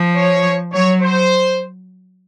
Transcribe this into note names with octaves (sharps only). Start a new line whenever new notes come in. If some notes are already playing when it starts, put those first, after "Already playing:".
Already playing: F3
C#5
F#3 C#5
C5